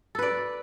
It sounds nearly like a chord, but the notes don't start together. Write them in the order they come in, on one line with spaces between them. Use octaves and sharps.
A4 B4 D5